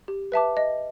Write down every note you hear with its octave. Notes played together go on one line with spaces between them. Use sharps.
G4
B4 E5 A5 D6
D#5